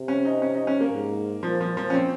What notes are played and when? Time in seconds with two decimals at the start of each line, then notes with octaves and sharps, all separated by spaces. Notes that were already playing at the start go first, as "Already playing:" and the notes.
Already playing: C3
0.08 C#4
0.25 D#4
0.42 C#4
0.55 D#4
0.67 C#4
0.80 A#3
0.92 G#2
1.43 A#2 F3
1.61 F3
1.77 F3
1.90 C#4
1.94 C4